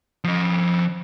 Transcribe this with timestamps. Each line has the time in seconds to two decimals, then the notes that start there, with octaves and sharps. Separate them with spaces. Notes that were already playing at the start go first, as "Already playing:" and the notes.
0.24 F3 D#5